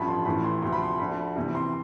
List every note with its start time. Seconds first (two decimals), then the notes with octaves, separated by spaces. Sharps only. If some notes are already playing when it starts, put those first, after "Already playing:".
Already playing: A1 G2 D3 F3 B5
0.08 C6
0.25 A1 A2 E3 B5
0.44 C6
0.62 D2 C3 F3 C6
0.73 B5
0.83 C6
1.00 D2 D3 F3 B5
1.36 C2 C3 E3
1.55 C6